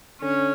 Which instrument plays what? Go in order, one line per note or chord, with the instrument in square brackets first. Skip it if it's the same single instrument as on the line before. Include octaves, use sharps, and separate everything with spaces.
[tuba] D3 [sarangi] C#4